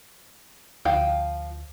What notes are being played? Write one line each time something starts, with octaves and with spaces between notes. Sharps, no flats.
D2 F3 F5 G5